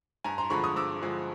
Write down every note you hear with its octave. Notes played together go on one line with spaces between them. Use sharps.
G2 G#5 A#5
A#5 C6
D3 F3 G#3 B5 C#6
C#6 D#6
G2 D6 E6
D3 F3 G#3